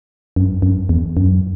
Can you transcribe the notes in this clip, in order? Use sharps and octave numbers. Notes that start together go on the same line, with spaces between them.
F#2
F#2
E2
F#2